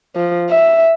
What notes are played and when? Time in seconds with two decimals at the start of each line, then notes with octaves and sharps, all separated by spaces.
0.16 F3
0.50 E5